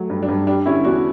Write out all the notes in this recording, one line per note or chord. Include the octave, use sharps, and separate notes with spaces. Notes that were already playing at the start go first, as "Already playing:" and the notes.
Already playing: F#3 A3
G2
D4
G2
G3 D4
D3 C#4 E4
E2 D4 F#4